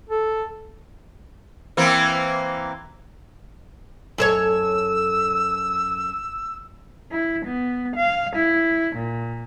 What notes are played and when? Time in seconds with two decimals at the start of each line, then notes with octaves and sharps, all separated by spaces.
0.10 A4
1.77 E3 A#3 C4
4.18 F#2 A4 C#5 E6
7.12 E4
7.46 B3
7.97 F5
8.36 E4
8.95 A#2